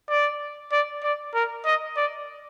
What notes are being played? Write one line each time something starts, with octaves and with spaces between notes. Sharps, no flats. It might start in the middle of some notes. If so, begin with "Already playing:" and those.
D5
D5
D5
A#4
D#5
D5